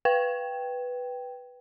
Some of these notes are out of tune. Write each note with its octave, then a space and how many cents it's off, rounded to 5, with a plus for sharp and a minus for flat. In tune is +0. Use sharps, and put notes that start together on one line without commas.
B4 +0 G5 +0